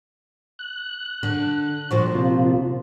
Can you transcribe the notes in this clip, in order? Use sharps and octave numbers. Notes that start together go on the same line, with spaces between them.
F#6
D3
A#2 F3 F#4
C3 F4